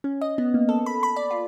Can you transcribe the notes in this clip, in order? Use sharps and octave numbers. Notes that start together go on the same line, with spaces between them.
C#4
D#5
B3
A#3
A4
B5
B5
D5
F4